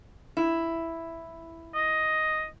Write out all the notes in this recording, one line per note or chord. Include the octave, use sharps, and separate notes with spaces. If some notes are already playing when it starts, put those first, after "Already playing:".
E4
D#5